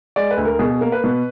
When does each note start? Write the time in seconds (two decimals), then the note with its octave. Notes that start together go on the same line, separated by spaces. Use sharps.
0.16 G#3 D5
0.31 B4
0.37 D2
0.45 A#4
0.59 B2 G#4
0.70 G#4
0.81 A#3 A#4
0.92 B4
1.04 B2